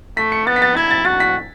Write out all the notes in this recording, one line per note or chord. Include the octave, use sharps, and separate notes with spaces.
A3 B6
C#7
B3 A6
B6
A6
E4 G#6
A6
F#4 A6
B6